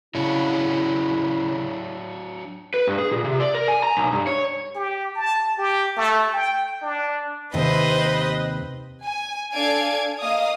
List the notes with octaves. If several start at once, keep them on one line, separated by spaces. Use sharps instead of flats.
C#3 F#3 D4 E4 C#5
B4
G2
G#4
A#2
C3
D5
A#4
G#5
A#5
B1
G2
C#5
G4
A5
G4
A3
G5
D4
D#2 C3 B4 C5 D#5
G#5
D4 A4 F5 G#5 G#6 D7
A#3 D#5 F5 D#6